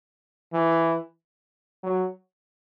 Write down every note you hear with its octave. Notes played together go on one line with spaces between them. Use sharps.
E3
F#3